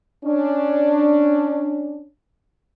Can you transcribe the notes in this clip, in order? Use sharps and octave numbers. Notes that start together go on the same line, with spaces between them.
C#4 D4